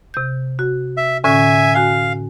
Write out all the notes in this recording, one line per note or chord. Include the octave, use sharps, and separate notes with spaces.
C3 G6
F#4
E5
A2 D3 C#4 E5 G#5
F#4 F5 G#5